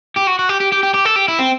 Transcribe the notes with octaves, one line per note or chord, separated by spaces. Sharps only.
G4
F#4
F#4
G4
G4
G4
G4
G4
A4
G4
E4
C4